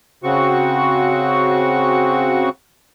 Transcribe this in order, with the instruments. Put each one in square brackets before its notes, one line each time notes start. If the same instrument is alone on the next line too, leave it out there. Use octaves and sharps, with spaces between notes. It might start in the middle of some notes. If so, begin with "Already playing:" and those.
[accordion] C#3 C4 F#4 C#6